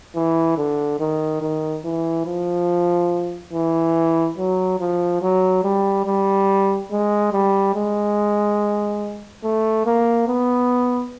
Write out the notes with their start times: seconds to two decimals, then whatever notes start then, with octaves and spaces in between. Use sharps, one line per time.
0.15 E3
0.57 D3
1.00 D#3
1.41 D#3
1.85 E3
2.26 F3
3.53 E3
4.38 F#3
4.80 F3
5.21 F#3
5.64 G3
6.06 G3
6.91 G#3
7.32 G3
7.75 G#3
9.44 A3
9.86 A#3
10.28 B3